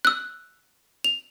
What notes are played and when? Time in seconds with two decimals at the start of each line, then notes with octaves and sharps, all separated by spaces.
0.05 E6 F#6
1.04 F7